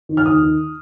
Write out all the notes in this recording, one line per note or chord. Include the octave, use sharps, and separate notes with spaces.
D#3
F6
D#2 D#6
D#3